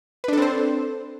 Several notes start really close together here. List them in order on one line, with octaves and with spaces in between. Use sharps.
B4 D4 A4 C4 C5